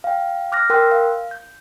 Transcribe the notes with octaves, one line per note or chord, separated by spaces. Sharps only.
F5 G5
D6 F6 F#6 A#6
A#4 G5 C6 E6 F#6
F5
G6